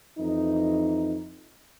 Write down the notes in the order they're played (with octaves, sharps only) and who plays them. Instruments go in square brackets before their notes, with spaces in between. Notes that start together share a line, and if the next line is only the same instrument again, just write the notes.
[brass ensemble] F2 E3 D#4